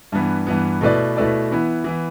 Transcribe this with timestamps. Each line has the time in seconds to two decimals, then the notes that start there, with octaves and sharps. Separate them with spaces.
0.12 G2 E3 B3
0.47 G2 E3 B3
0.81 B2 A3 E4 B4 D5
1.17 B2 A3 E4 B4 D5
1.51 E3 B3 E4
1.84 E3 B3 E4